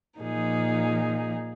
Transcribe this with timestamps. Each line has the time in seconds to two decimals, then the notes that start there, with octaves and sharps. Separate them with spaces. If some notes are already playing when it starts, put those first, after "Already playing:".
0.19 A#2 F3 A#3 D#4 G#4